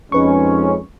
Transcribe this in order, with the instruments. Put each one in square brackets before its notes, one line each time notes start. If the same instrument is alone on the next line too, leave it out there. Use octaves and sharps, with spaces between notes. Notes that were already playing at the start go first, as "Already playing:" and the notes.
[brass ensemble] F2 G#3 C#4 [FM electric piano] D#4 B4 C#6